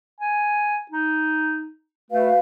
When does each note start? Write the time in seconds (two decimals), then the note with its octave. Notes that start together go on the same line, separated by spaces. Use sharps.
0.20 G#5
0.91 D#4
2.11 A3 F#4 B4 F5